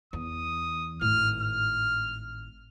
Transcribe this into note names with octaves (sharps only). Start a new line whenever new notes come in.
E2 D#6
G#1 A2 F6
F6